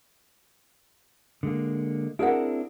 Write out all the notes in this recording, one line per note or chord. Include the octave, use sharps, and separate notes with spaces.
D3 G#3 A#3
C4 D4 E4 G#4 A#4 F#5